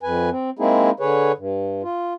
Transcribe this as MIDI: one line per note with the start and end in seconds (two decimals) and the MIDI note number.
0.03 0.30 41
0.03 0.30 71
0.03 0.30 80
0.31 0.50 60
0.59 0.90 56
0.59 0.90 58
0.59 0.90 60
0.59 0.90 63
0.59 0.90 64
0.59 0.90 68
1.00 1.32 50
1.00 1.32 68
1.00 1.32 71
1.00 1.32 73
1.38 1.83 43
1.83 2.14 65